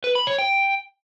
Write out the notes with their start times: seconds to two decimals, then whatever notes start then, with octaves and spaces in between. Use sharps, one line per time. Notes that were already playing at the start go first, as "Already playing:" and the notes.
0.04 B4
0.15 B5
0.27 C#5
0.39 G5